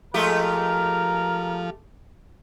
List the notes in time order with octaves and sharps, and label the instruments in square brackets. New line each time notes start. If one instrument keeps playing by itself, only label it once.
[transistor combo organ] F3 [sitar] G#3 A3 G4 [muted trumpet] A#4